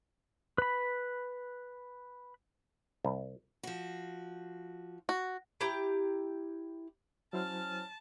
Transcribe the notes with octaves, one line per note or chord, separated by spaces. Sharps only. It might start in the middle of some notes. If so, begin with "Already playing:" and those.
B4 B5
C2
F3 F#4
F#4
E4 G4 A#5
F#3 C#4 E4 C5 A5 F6